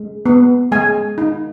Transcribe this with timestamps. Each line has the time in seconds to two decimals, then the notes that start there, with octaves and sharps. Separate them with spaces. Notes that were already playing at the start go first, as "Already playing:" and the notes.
Already playing: G#3
0.26 B3
0.72 G#3 G#5
1.18 D#4